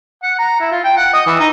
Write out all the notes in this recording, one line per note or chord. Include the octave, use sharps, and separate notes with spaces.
F#5
A#5
E4
F4
G5
F#5
D#5
E3
D#4